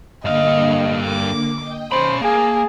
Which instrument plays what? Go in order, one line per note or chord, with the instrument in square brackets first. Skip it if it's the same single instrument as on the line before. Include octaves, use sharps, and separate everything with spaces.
[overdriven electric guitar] G2 F5 [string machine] D3 A#3 [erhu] D#5
[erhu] D6
[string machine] D#5 G5
[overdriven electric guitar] C#4 B5 [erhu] C5 [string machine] A5
[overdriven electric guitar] A#3 [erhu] G#4